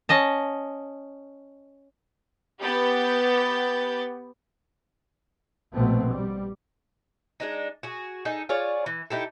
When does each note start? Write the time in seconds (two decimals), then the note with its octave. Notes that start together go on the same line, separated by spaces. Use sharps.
0.09 C#4 D#5 A5
2.63 B3 G4 G6 A6
5.73 A#1 B2 A3 B3 C4
6.10 G3
7.40 G#3 D4 D#4
7.83 F#4 G#4
8.25 D#4 G#4 A4
8.49 F4 G#4 C#5 D5
8.86 E3
9.10 D#4 E4 G4 A4